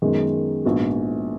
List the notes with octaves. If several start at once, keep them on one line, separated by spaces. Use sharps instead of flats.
F#2 D#3 G#3 B3
A#1 G#2 F3 B3 F#4